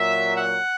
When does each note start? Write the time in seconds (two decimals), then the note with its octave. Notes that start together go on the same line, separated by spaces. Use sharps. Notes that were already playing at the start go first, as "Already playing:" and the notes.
Already playing: A#2 F#3 E5
0.37 F#5